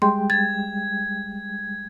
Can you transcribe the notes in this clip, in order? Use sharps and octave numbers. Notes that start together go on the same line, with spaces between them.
G3 G#3 G5 C6
G#6 A6